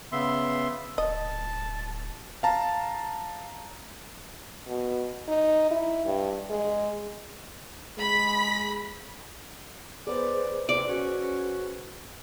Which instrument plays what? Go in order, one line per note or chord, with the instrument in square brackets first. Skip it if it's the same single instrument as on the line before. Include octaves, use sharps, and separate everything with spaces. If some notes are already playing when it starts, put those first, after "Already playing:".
[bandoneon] C#3 B3 E5 C6
[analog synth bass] D1 [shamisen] D#5 [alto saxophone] A5
[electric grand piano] F5 A5 A#5
[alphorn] B2
D#4
E4
G2
G#3
[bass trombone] G#3 [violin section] B5 B6
[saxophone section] B3 D5 [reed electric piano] G#4 B4 C5
[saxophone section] C3 [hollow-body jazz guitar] D5
[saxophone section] C#4 F#4